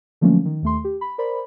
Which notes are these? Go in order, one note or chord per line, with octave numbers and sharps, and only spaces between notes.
D3 F3 F#3 A3 A#3 C#4
D#3
D#2 A3 C6
G4
B5
A#4 C5 D5 B5